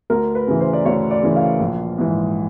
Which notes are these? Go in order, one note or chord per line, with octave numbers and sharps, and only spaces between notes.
D2 A#4
B4
C#3 E3
C5
D5
D2 C#5
D5
C#3 E3
F5
A#1
G#2 E3